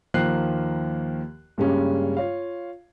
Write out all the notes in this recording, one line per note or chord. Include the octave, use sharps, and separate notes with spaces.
D#2 D#3 F3 A#3 F#6 C7
G2 C#3 G3 G#3 A#3 C#4
F4 C#5 F5